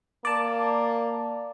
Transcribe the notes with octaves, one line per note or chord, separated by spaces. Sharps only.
A#3 D5 A5